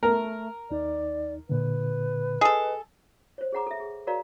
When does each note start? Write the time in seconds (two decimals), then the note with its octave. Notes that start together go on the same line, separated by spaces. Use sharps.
0.03 A3 A#4
0.71 D#2 D#4 D5
1.49 A#2 D3 B4
2.41 G#4 A4 D#5
3.38 C5 C#5
3.52 G#4 C#5 F#5 A#5 D6
3.67 A4 E5
3.80 G#4
4.07 F#4 A#4 C#5 D5 F5 A#5